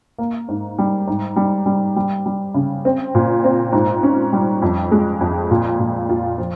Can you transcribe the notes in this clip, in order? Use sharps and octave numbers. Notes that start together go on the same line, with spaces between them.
A#3
G#2
G3
G#2
G3
G3
G3
G3
C#3
C4
A#2
C4
G#2
C#4
G3
F2
G#3
F2
A#2
A#2
F4
F3